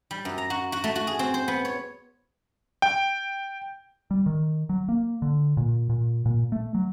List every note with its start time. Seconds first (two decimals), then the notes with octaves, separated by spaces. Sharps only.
0.11 G3
0.25 F#2
0.38 A#5
0.50 F#4
0.72 F#4
0.84 A3
0.96 F#4
1.07 G#4
1.19 C4
1.34 C5
1.48 B3
1.65 C#5
2.82 G5
4.11 G3
4.26 D#3
4.69 F#3
4.89 A#3
5.22 D3
5.57 A#2
5.90 A#2
6.26 A#2
6.52 A3
6.75 F#3